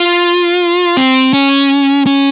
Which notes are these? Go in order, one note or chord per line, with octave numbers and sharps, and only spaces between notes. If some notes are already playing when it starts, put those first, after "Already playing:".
Already playing: F4
C4
C#4
C#4